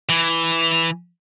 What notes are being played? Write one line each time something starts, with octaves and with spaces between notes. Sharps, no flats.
E3